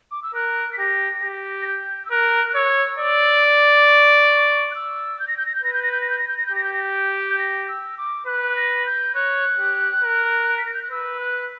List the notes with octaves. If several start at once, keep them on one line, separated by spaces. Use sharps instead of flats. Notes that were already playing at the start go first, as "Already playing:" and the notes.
D6
E6
A#4 F#6
B6
G4 A#6
G4
A#6
G6
E6
A#4 F#6
F#6
C#5 E6
D5 E6
D6
D6
C#6
F#6
E6
G6
A#6
G6
A#6
G6
B4 A#6
G6
A#6
G6
A#6
G6
A#6
G6
A#6
G6
G4 A#6
G6
A#6
G6
G6
A#6
E6
D6
B4 F#6
A#6
G6
C#5 F#6
G4
A#4
B6
A#6
G6
F#6
B4 E6
F#6